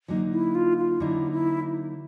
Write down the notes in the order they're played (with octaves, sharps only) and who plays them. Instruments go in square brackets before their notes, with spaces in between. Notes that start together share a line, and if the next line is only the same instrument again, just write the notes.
[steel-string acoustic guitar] D3 F#3 A#3 D#4
[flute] E4
F4
F4
[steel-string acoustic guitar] D3 F#3 A#3 D#4 [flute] E4
[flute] E4